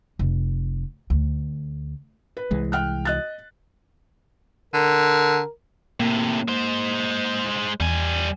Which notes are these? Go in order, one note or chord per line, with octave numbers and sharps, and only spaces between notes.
F1
D2
B4
C2 E3 G#3
G5 F6 F#6
D#5 F#6 A6
D3 A#4
A2 C3 A#3
G#3 C5
E2 G3 G#5